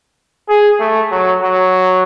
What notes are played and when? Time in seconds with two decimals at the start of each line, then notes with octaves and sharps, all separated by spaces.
0.48 G#4
0.79 A3
1.11 F#3
1.42 F#3